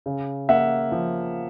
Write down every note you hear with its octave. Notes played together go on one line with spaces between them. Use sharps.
C#3
A#3 E5 F#5
F3